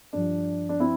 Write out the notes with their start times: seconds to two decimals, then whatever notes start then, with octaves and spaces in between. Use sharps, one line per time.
0.13 G2 F3 D4
0.69 D4
0.80 C4 E4